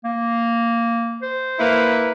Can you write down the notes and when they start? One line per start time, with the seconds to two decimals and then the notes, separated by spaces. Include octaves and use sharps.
0.04 A#3
1.22 C5
1.59 A#3 E4 B4